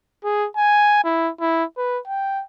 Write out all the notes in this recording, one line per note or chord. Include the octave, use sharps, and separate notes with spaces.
G#4
G#5
E4
E4
B4
G5